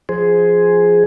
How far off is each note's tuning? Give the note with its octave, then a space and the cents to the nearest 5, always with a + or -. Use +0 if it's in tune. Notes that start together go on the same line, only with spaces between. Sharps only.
F3 +0 G#4 +5 C5 +0